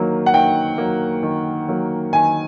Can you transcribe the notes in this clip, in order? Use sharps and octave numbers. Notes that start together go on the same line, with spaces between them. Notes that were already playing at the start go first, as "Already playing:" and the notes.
Already playing: D#3 F#3 A#3
F#5
D#3 G5
F#3 A#3
D#3
F#3 A#3
D#3 G#5